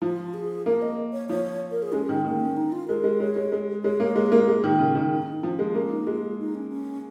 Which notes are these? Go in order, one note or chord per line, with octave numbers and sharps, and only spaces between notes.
F3 F4
G#4
A#3 A#4
D#5
C#5
F3 C#5
A#4
G#4
G#3 C#4
D#3
D#3 A#3
C#4
D#4
F4
G#3 A#4
G#3
G#3 C#5
G#3
G#3
G#3 C#5
A#3
G#3 C#5
A#4
A#3
F4
G#3
D#3
C#3
D#3
D#4
C#4
D#4
F3 C#4
G#3 A#3
A#3 C#4
D#4
G#3 F4
D#4
C#4
C#4